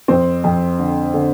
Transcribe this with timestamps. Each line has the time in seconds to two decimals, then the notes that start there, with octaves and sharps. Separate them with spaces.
0.08 F2 C4
0.44 F2
0.79 D3
1.14 D3